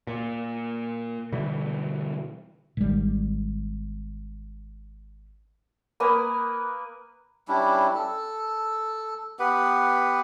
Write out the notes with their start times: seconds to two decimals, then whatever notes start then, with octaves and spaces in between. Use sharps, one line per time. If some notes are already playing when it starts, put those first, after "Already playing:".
0.07 A#2
1.32 B2 D3 E3 G3
2.77 G#1 G3
6.00 A#3 B4 G#5 D#6
7.48 G3 C#4 D4 E4
7.95 A4
9.39 B3 G4 B4 F#5